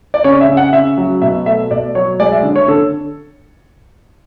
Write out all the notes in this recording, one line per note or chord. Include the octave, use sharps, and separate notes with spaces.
D5
C#3 C#5
E5
C#3
F#5
C#3 E5
F#3
B2 E5
A3 E5
B2 D5
F#3 C#5
G#3 D5
E5
D3
C#5
D3 A4